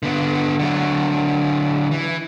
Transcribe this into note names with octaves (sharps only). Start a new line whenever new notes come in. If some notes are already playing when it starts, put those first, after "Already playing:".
D3 B3
D3 F#3
E3